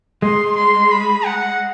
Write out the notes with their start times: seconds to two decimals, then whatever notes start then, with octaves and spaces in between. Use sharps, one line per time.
0.22 G#3 C6
0.57 C6
0.92 B5
1.26 F#5